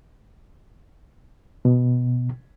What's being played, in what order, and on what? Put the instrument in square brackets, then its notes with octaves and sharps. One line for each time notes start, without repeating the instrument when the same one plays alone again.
[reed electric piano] B2